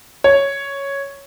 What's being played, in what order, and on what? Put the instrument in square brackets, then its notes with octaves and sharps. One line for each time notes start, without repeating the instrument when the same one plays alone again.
[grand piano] C#5